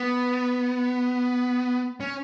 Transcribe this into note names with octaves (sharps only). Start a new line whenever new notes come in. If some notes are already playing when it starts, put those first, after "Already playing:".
Already playing: B3
C#4